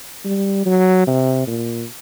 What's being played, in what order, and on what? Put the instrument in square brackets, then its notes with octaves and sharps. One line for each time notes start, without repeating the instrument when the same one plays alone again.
[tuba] G3
F#3
C3
A#2